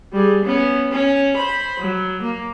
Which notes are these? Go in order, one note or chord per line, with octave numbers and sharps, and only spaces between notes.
G3 G#4
B3 C#4
C#4
C5 B5
F#3
A#3